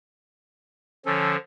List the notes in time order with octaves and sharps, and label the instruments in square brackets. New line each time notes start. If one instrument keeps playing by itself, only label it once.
[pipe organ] D3 F3 [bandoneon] C#4 A4